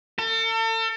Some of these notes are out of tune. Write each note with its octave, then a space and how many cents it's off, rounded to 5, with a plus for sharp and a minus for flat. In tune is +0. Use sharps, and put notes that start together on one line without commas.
A4 +40